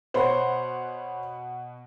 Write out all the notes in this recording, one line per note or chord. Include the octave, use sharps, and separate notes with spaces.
B2 C5 C#5 F#5 B5